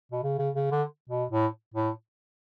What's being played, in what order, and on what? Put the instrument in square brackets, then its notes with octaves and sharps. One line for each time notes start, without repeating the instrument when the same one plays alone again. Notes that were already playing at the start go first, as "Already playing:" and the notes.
[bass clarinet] B2
C#3
C#3
C#3
D3
B2
A2
A2